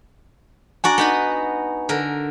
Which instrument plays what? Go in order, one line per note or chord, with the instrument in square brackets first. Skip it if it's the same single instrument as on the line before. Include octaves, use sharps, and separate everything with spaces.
[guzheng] D4 F#4 D5 [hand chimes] G#5 A#5
[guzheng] B3 D#4 B4
D3 A#4